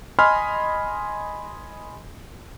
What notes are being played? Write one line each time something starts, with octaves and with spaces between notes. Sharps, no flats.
D#5 G#5 B5 C6 F6